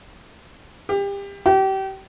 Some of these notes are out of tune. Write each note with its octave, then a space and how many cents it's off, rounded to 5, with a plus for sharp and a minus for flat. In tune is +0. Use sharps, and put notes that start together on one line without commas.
G4 +30
G4 -30